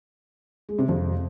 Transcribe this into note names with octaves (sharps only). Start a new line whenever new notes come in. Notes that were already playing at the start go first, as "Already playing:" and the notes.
G#3
C3
F2